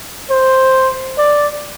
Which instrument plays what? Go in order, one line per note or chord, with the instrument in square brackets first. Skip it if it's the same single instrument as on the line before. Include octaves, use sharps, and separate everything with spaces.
[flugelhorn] C5
D5